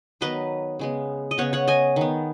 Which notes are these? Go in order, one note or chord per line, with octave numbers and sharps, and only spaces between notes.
D#3 F#3 B3 B4 D#5
C#3 G#3 B3
D#5
C#3 B3 C#5 F#5
C#5 F#5
D#5 G#5
D#3 B3